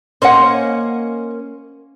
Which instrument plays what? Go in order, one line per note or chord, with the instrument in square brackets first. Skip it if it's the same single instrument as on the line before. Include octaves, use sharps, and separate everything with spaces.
[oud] A#3 C#4 C5 [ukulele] D#5 F#5